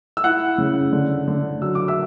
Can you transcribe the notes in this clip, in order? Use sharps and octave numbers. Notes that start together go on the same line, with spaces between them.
E6
E4 F#5 F#6
C#3
D3
D3
F#3 E6
D6
E5 E6